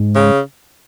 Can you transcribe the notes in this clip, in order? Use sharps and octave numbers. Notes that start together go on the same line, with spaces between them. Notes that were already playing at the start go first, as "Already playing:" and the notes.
Already playing: G#2
C#3